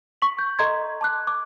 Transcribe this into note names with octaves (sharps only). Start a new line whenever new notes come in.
C#6 B6 F#7
G6
A4 D#5 A#5 C6 G#6
A5 D6 F#6
D6